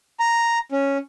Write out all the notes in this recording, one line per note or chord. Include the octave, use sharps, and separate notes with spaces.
A#5
C#4